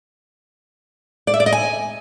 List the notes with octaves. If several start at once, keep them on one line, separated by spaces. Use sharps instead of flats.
D5
E5
D5
D#5
G#5